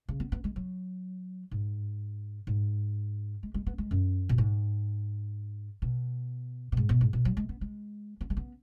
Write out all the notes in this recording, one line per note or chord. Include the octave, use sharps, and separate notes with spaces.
C#3
B3
B3
G#3
F#3
G#2
G#2
G#3
G#3
B3
G#3
F#2
B2
G#2
B2
B2
G#2
B2
G#2
B2
F#3
G#3
B3
G#3
B3
G#3
B3